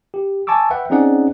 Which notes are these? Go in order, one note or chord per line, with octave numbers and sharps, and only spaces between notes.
G4
G#5 A5 C#6 D6 E6
B4 E5 F#5 G5
C4 C#4 D#4 G#4 D5 F#5